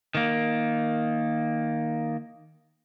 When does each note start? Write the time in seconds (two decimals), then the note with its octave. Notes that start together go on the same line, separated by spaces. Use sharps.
0.15 D#3 A#3